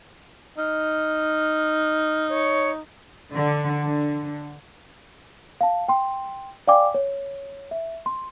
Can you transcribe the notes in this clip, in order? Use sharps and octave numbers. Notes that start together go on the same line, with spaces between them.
D#4 F6
C#5
D3
D3
F5 A5
G5 C6
D5 F5 G5 G#5 D6
C#5
E5
C6